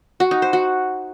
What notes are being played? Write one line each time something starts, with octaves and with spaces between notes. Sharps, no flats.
F#4
D#4
C5
F#4